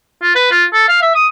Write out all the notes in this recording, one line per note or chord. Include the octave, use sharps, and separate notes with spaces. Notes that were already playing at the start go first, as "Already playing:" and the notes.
F4
B4
F4
A4
F5
E5
D#6